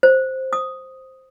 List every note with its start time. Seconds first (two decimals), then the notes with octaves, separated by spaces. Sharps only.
0.03 C5
0.53 D#6